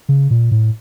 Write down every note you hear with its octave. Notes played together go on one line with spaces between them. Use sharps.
C#3
A#2
A2